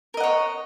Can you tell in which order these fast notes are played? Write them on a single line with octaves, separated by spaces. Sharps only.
A#4 D#5 F#5 C#5